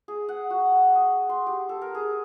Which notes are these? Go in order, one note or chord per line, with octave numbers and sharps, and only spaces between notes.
G#4
F#5
F#4
D#5
C6
G4
A4
A#4
G#4